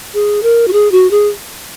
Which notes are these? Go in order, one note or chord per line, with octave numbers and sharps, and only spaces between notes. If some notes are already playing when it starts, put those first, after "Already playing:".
G#4
A#4
F#4
G#4
F#4
G#4